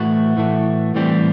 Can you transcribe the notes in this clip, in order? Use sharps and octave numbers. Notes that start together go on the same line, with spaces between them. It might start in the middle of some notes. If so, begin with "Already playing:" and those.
Already playing: A2 E3 A3 F#4
A2 E3 A3
A2 E3 G3 C4